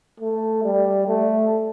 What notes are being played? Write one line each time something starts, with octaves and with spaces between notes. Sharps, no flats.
A3
G3
A3